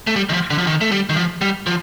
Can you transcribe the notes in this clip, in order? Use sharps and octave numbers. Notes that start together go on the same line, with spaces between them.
A3
G3
D#3
F3
D3
F3
D#3
A3
G3
D#3
F3
G3
F3